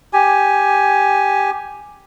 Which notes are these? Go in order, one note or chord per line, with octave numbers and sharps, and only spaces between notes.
G4 G#5